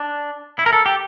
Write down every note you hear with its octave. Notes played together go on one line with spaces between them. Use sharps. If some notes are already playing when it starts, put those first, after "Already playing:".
Already playing: D4
E4
A#4
A4
G4